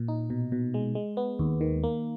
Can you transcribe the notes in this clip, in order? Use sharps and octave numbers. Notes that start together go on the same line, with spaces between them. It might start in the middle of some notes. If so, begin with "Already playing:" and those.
Already playing: A#2
D#4
B2
B2
G#3
G#3
B3
D#2
D#3
A#3